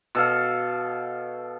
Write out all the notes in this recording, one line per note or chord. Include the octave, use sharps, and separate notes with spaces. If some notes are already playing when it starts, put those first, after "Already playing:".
B2 A4 F5